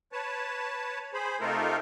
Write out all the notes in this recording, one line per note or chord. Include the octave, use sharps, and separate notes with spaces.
B4 C#5 A5
G#4 C5 B5
C3 A3 D#4 F4 A4 A#4